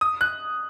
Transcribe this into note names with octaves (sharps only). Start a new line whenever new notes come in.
D#6
F#6